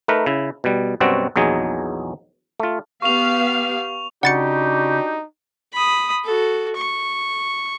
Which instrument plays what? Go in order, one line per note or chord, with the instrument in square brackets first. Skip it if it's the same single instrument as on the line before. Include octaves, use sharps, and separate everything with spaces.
[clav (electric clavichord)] A3 D#4 A#4 B4
C#3 E4
B2 G3
F#2 B2 F#3 G3 C4 F#4
A#1 E2 F#3 D#4 G#4
A3 F4
[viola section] B3 G4 F5 [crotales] C#6 F7
[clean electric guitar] C#3 [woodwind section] D4 F#4 G4 [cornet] D#4 [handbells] F#5 A6 C#7
[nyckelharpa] B5 D#6
F#4 A4
C#6